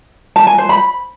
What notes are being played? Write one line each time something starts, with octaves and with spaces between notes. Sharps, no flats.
A5
G#5
C5
B5